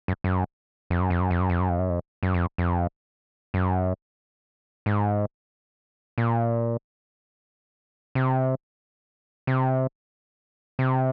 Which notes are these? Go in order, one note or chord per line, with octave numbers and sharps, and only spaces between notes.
F#2
F#2
F2
F#2
F2
F#2
F2
F#2
F2
F#2
F2
F#2
F2
F#2
F2
F2
F#2
G#2
A#2
C3
C3
C3